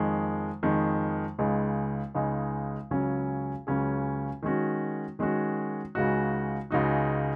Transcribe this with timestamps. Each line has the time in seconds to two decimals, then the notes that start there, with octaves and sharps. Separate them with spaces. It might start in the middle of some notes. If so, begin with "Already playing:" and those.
Already playing: F2 D#3 G#3
0.63 F2 D#3 G#3
1.39 C#2 C#3 G#3 D#4
2.15 C#2 C#3 G#3 D#4
2.91 C#2 C#3 F#3 C#4 G#4
3.67 C#2 C#3 F#3 C#4 G#4
4.43 D#3 G#3 C#4 F#4
5.19 D#3 G#3 C#4 F#4
5.95 C#2 C#3 G#3 D#4 F#4
6.71 C#2 C#3 G#3 D#4 F#4